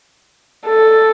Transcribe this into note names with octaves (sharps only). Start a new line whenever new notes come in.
A4